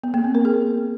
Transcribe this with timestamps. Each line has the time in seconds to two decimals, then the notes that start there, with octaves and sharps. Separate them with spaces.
0.03 B3
0.14 A#3
0.24 C4
0.35 A#4
0.45 G#4